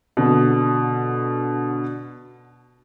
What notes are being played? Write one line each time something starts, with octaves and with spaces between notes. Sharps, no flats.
B2 D3